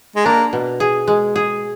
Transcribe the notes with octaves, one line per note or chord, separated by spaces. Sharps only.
G#3
A#3 D4
B2
G#4
G#3
G#4